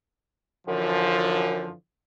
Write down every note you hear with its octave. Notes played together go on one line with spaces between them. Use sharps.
F#2 D3 E3 F3